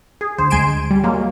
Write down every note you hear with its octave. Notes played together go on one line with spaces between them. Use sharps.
G#4
D2 C5
D2 G#3 G#5 C6 D7 E7
G3
F#3 G#3 A#3